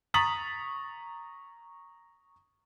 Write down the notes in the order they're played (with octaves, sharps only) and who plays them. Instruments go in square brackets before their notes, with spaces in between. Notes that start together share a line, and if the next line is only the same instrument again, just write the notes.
[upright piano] A#5 C#6 D#6 A6 B6 F#7